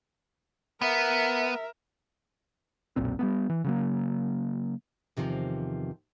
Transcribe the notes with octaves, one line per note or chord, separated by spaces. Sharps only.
B3 A#4 E5
F#1 B1 A#2 C4
G3 A#3 B3
E3
C#3 F#3 A#3
E2 C3 D#3 F3